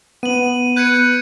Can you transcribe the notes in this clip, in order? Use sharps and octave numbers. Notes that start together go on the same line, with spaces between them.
B3 D#7 F#7
B4 G6 G#6 C#7